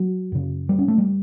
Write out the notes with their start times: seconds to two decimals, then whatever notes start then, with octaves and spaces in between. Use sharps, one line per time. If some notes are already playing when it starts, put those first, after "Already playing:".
Already playing: F#3
0.32 F#2 C#3
0.69 G3
0.79 C#4
0.88 A3
0.98 G3